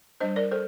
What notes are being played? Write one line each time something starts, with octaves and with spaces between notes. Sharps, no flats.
G3 D4 C5 D#5
A#4 D5
A4 C5